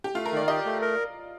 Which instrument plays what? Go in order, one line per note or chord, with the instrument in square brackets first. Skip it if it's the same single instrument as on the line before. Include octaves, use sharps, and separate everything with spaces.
[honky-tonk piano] G4
[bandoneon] A3 [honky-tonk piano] F4
[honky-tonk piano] A#4
[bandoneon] D#3 [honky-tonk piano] D5
[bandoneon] G4 [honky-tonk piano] D#5
[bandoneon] A3
A#4